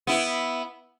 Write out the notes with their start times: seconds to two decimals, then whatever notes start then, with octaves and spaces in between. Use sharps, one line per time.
0.07 B3 E4